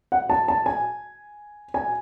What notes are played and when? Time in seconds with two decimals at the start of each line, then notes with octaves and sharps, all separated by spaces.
0.12 F#5
0.30 A5
0.48 A5
0.66 G#5
1.74 G#5